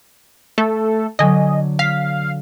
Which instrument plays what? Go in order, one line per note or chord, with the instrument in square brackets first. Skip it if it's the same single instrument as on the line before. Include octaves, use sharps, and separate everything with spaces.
[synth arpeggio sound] A3 A4
[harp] D3 F#3 [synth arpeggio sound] D#5 G#5
[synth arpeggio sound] F5 [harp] B6